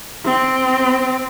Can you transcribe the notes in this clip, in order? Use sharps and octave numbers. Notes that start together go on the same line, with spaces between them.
C4